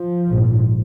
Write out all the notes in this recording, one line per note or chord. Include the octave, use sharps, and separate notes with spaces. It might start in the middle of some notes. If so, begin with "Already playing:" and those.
Already playing: F3
A#1 G#2